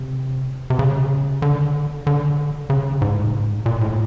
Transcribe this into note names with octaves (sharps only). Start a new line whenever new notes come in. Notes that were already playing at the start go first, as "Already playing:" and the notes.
Already playing: C3
C3
C#3
D3
D3
C#3
G#2
A2
G#2
A#2
A2